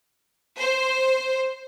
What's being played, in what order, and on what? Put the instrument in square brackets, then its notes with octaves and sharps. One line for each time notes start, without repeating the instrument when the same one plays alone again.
[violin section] C5